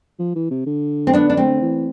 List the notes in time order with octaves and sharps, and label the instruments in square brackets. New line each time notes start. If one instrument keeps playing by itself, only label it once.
[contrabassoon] F3
E3
C3
D3
[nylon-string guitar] C4
[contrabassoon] D3 [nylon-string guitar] B3 D4
[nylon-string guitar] D4
A3 C4
[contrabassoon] E3